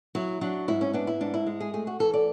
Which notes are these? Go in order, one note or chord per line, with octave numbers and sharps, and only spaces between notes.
F#3 E4
F#3 D4
G#2 E4
C#4
B3 D4
E4
G#2 D4
E4
G#3
G#4
A3 G#4
F#4
E3 A4
D5